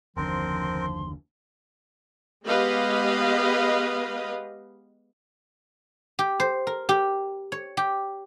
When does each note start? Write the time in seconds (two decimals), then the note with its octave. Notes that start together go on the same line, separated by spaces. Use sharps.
0.17 F#1 D#2 D3 F3 C4 A#4 C6
2.44 G#3 B3 G4 B4 D#5 F5
6.19 G4
6.40 C5
6.67 A#4
6.89 G4
7.52 C#5
7.77 G4